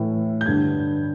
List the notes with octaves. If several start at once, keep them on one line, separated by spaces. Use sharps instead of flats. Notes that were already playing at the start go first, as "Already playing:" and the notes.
Already playing: A2 E3
G6
G2 D3 G#6